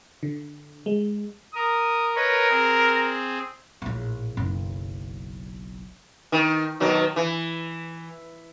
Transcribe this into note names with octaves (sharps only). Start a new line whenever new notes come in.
D3
G#3
A#4 D#6
A#4 B4 C#5 D#5
C4 G#4
A#1 A2
F#1 B1
D#3
B2 D#3 F#3
E3